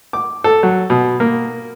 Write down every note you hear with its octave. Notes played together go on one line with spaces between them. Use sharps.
D6
A4
F#3
B2
A#3